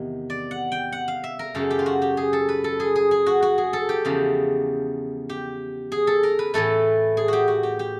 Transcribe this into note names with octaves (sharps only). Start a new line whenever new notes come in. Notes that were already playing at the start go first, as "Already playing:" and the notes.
Already playing: E2 C3 D#3
D5
F#5
G5
F#5
F5
E5
A#4
F#2 C#3 F#3 A4
G4
F4
F#4
G4
G#4
A4
B4
A4
G#4
G#4
G#4
F#4
F#4
G#4
A4
G4
E2 C#3 F3
G4
G#4
A4
A#4
B4
A2 E3 A3 A4
G#4
F#4 G4
F#4
G4
G4